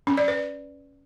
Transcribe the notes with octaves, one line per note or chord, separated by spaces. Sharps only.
C#4
D5
B4